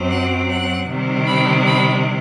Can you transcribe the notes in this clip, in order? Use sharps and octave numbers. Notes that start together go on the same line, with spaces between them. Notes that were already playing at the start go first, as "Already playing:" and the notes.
Already playing: F#2 F#3 C4
F#5
F#5
C3 D#3 G3 C4
B5
B5